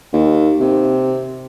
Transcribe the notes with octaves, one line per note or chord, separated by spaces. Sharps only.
D#2
C3